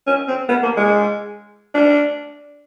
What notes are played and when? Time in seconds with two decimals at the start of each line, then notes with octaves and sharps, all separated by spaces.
0.07 C#4
0.28 C4
0.49 B3
0.63 A#3
0.77 G#3
1.74 D4